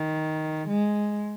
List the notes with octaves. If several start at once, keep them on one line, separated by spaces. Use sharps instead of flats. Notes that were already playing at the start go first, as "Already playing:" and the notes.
Already playing: D#3
G#3